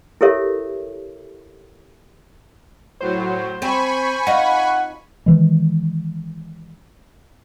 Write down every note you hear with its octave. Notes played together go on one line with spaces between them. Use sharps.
E4 G4 A4 A#4 C#5 E5
A2 F#3 C5
C4 G#5 B5 C#6
D#4 F4 F#5
D#3 E3 G#3